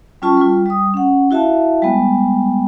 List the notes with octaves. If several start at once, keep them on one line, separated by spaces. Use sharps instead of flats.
G3 C#4 F4 A5 C#6
G3 F4
G3 D#6
C#4 F#5
E4 F#4 E5 F5 A5
G3 G#3 B3